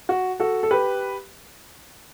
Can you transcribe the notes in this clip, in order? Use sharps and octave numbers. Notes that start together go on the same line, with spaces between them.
F#4
F#4 A4
A4
G4 B4